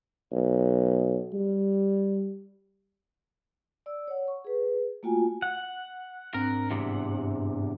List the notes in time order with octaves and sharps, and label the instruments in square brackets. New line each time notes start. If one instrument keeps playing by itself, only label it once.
[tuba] B1
G3
[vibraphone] D5 E6
C#5 F#5
C#6
G#4 B4
A3 A#3 F4 F#4 G5 G#5
[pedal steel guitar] F#5
[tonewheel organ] G#2 D4 [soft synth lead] C4 [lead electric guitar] A#4
[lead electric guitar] E2 C3 [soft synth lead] G2